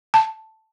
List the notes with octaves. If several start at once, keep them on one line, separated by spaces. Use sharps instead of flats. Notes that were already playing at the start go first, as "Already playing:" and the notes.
A5